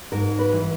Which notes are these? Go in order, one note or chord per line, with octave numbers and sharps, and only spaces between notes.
G#2 A#4
B4
E3